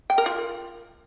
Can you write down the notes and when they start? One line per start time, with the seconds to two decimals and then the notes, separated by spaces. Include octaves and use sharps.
0.10 G5
0.18 A#4
0.26 F4